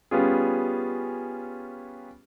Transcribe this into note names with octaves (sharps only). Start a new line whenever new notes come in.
G3 B3 C#4 F4 G#4